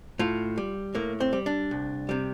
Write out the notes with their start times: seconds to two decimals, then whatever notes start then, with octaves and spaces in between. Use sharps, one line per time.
0.19 A2 F4
0.58 G3
0.95 A2 A#3
1.20 C4
1.33 G3
1.46 D4
1.71 C2
2.09 C3 G3